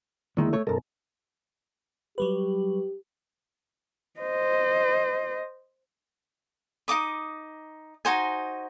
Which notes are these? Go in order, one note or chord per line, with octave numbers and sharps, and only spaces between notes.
E2 D3 D#3 G#3 A#3 E4
A3 C#5
B1 F#2 A4 A#4
F#3 G3 G4 B4
C5 D#5
D#4 D#5 D6 D#6
D#4 F#4 C5 G#5